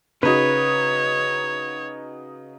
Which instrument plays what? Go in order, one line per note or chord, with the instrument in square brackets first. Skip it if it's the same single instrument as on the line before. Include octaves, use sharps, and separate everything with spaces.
[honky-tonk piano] C#3 D#4 F#4 [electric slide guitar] B4 [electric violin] C#5